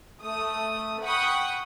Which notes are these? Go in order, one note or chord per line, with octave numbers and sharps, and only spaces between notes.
A3 D#6
F#5 G5 B5 C#6 D#6